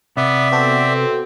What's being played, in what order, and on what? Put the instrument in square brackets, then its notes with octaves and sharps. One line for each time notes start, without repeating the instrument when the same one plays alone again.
[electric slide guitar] C3 [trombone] B3 [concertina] D5 E5
[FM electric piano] B3 F#4 A4 [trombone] C4